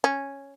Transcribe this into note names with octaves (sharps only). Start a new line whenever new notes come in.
C#4